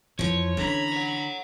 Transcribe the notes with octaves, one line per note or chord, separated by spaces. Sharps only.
F2 E3 F3 C#5
D3 E3 C#4 A#5 B5
C#5 F#5